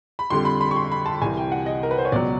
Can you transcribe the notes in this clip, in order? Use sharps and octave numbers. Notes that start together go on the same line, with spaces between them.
B5
F2 D3 G3 C6
B5
B5
C#6
C6
B5
A5
C2 C3 E3 G3 G#5
G5
F#5
D#5
A#4
B4
C5
C#5
C#2 B2 F#3 D5